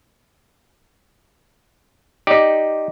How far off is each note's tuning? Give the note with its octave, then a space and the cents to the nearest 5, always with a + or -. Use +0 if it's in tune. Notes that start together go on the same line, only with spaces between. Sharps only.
D#4 +0 G4 +0 D5 +0